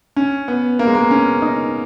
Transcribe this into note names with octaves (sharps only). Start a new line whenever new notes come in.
C#4
B3
A#3
G#3
A#3
C#4
D#4